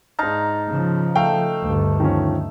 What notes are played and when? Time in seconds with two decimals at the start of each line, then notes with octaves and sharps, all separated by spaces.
0.19 G#2 D#4 F5 A5 A#5
0.68 C#3 F3
1.15 A3 F5 G5
1.61 D2 G2
2.00 D#3 F3 C#4